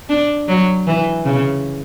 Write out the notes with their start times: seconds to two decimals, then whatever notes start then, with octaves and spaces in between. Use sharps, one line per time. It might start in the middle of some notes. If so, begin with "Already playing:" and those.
0.09 D4
0.48 F#3
0.87 E3
1.25 C#3